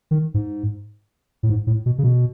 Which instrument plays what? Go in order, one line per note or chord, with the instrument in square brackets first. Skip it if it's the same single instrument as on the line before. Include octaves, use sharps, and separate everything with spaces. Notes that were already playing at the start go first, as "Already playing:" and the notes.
[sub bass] D#3
G#2
A2
G#2
A2
B2
C#3
B2